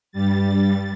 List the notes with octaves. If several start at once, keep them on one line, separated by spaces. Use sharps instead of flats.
G2 G3 A6